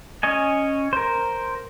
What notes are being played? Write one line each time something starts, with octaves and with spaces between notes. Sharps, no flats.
C#4 C#5 D#5 G#5
A#4 C5